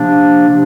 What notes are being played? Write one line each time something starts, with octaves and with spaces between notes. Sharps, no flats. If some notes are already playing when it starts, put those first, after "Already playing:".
Already playing: C3 F3 A#3 D4
C3 F3 A#3 D4